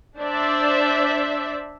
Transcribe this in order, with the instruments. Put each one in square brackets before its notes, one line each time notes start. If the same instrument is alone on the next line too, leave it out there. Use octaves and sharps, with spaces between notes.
[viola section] D4 C5 D5 E5